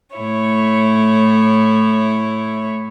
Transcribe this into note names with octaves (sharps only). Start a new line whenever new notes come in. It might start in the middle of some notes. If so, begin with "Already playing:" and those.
A2 E4 C#5